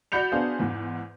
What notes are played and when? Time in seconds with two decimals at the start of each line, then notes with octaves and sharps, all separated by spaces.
0.12 F#4 D5 B5 G6 C#7 F7
0.32 B3 D4 F#4 G#4 C5 F5
0.59 E2 G#2